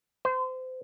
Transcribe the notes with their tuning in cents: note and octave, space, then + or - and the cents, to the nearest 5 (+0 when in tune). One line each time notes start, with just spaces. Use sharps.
C5 -30